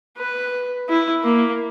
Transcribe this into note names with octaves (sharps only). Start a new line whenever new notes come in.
B4
E4
A#3